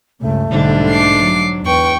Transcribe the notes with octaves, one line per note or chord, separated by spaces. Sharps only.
C#2 G2 C#3 A3
B1 G#2 D3 G3 D4
D6 C7
F#3
E2 B4 G5 C#6